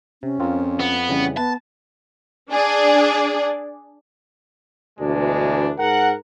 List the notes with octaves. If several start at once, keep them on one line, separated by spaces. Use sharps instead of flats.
C3 C#4
F2 C4 F4 A#4
B3
C#3 E3 G3 C#4
B3 B4 A5
D4 G#4 D5
D2 B2 E3 G#3 D4
G#2 A#4 F#5